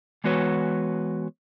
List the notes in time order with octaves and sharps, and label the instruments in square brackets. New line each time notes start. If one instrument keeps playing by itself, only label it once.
[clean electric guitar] E3 G#3 B3 F#4 B4 C#5